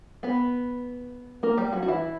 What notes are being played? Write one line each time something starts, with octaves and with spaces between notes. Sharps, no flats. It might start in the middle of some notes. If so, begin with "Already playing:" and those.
B3 B4
A#3 A#4
G3 G4
F#3 F#4
F#4
E3 E4